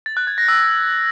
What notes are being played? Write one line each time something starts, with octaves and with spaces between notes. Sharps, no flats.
A6
F#6
G#6
A#6
E6